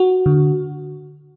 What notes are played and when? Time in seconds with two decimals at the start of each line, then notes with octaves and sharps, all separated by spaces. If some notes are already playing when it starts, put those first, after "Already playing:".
Already playing: F#4
0.26 D3